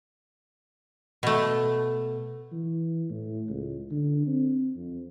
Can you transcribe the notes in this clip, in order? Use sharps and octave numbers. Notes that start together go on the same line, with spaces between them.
B2 A3
E3
A2
C#2
D3
C4
F2